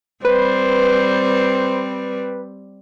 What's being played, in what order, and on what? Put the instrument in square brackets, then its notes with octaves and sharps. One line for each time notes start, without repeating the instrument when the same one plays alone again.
[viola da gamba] G3 C4 [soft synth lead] B4 [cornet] C5